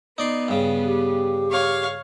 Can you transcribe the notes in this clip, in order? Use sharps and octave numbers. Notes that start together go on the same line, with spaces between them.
B3 D#4 D5 C6
G2 C#3
G4
C#5 F5